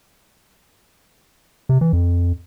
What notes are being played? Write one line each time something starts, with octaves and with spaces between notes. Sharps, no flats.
C3
E3
F2